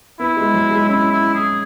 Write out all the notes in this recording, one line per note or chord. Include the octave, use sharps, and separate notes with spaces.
B3 E4
G#3
F#3
G#3
C#4 E4
E4
G#4